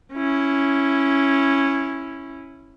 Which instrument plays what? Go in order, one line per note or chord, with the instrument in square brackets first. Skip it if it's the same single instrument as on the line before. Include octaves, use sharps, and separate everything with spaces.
[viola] C#4 E4